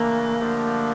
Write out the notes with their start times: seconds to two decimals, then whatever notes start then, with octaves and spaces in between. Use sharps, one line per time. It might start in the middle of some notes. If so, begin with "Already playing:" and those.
Already playing: C#3 E3 A3 A#3 D4
0.39 D3 F3 A3 D4 G4